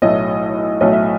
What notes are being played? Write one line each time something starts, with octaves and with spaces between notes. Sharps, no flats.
B1 A2 F#3 A3 D#5
B1 A2 F#3 A3 D#5
E5